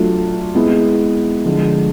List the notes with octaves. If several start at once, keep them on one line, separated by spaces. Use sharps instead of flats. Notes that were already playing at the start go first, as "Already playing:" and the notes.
Already playing: F#3 A3 D4 F4
G#3 B3 E4
D3 F3 G#3